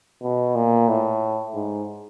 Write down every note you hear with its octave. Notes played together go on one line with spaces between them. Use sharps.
B2
A#2
A2
G#2